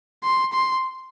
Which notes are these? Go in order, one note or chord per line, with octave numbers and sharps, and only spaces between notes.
C6
C6